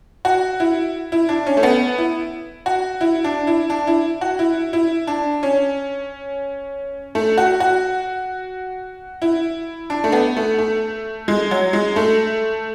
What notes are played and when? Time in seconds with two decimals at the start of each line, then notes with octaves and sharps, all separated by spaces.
0.25 F#4
0.60 E4
1.12 E4
1.29 D4
1.46 C#4
1.57 A3
1.63 B3
1.98 E4
2.66 F#4
3.01 E4
3.24 D4
3.47 E4
3.70 D4
3.87 E4
4.21 F#4
4.39 E4
4.73 E4
5.07 D4
5.43 C#4
7.15 A3
7.38 F#4
7.60 F#4
9.22 E4
9.90 D4
10.04 A3
10.12 B3
10.37 A3
10.58 A3
11.28 G#3
11.51 F#3
11.73 G#3
11.96 A3